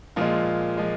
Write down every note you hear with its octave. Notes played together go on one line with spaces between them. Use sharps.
A#2 F3 G#3 F4
F3 G#3